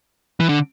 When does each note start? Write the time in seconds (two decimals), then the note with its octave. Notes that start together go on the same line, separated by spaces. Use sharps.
0.40 E3
0.49 D3